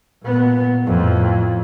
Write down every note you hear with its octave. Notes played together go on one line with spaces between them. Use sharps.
A#2 B3
F2 A2